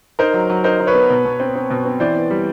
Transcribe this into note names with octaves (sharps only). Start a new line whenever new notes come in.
D#4 A#4 C5
F#3
F#3
D#4 A#4 C5
D#4
B4 C#5
B3
B2
B2
C4
C4
B2
C4
E3 C5 D5
B3
G3